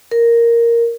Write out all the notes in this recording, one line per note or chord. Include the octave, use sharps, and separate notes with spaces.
A#4